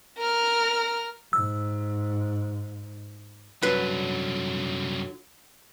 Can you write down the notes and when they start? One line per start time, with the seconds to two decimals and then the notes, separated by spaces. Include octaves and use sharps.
0.18 A#4 F6
1.33 G#2 E6
3.63 C2 F#2 D3 F#3 B4